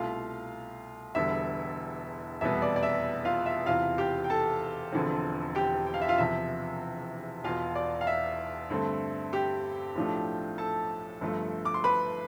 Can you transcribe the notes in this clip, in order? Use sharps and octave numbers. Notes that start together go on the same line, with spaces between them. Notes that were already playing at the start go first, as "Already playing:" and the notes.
Already playing: C2 B2 A3 F4 F5
E1 E2 D3 G3 B3 E5
F1 E2 B2 G3 B3 E5
D5
D5
E5
F4 F5
E5
E1 E2 C3 E3 F4 F5
G4 G5
G5
A4 A5
E1 E2 D3 F3 C4
G4 G5
G5
F5
E5
F4 F5
E1 E2 C3 F3 E5
E1 E2 B2 F4 F5
D5
F5
E5
G2 D3 A3 C4
G4 G5
B1 A2 F3 A3 D4
A4 A5
G1 G2 F3 A3
D6
C6
B4 B5